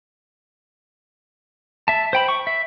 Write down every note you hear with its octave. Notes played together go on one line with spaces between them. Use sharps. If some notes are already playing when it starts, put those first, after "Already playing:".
E5 A5
C5 G5 B5
C#6
E5